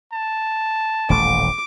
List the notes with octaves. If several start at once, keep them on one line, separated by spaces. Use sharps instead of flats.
A5
D#1 A1 A3 D6